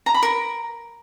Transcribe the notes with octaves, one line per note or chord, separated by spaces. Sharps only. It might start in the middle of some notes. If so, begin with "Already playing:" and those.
A#5
B5
A#4